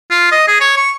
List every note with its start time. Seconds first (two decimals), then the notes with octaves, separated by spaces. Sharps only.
0.11 F4
0.32 D#5
0.48 G#4
0.60 C#5
0.77 C#6